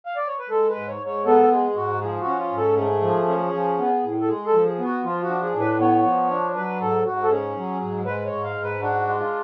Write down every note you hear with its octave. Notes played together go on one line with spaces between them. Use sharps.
F5
D5
C#5
B4
G#3 A4
B4
G#2
C#5
G#2
C#5
B3 A4
G#3 G#4
G#2 F#4
F3 G#4
F#4
C#4
F4
G#2
A4
A3 G#4
F3
C#4
F3
B3
A2
A4
G#3 G#4
A4
F3
G#4
B3
F#4
F3 F4
F#4
D4
G#4
A2
B4
B3 C#5
F3
D4
F#3 B4
G#2 A4
G#2 F#4
A4
C#4 G#4
F#3
G#2
G#3 B4
C#5
G#2
F5
G#2
B4
D4 F#4
G#3
F4